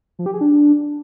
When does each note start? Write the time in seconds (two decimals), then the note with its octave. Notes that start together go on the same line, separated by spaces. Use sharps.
0.19 F3
0.26 G4
0.33 G#4
0.41 D4